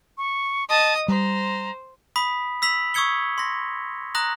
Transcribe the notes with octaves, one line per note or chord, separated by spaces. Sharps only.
C#6
D#5 A5 D#6
G3 C5 A#5
B5 D#6 B6
E6 B6 F7 F#7
C#6 D#6 E6 G#6 C#7 G7
C6 A#6
A#5 D#6 F#6 A#6 F#7